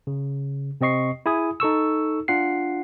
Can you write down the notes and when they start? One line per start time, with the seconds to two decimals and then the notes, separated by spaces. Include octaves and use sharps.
0.07 C#3
0.81 C3 C4 D#5 C#6 C7
1.26 E4 G#4 G#5 D#6
1.60 D#4 A4 C#6 E6
2.28 D4 F4 F#5 C7